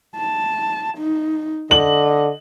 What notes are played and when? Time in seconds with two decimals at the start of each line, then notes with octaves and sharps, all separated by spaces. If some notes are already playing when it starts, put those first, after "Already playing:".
0.16 A5
0.98 D#4
1.71 D3 D#5 F#7